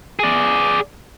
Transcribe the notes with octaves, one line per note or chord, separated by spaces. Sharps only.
G#4 D5